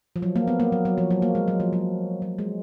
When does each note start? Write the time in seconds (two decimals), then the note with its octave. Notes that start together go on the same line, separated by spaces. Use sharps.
0.16 F3
0.22 F#3
0.36 A#3
0.48 B3
0.60 A#3
0.72 F#3
0.85 F#3
0.98 F3
1.10 F#3
1.22 A#3
1.35 G#3
1.48 F#3
1.60 F3
1.73 F#3
2.22 F#3
2.38 G#3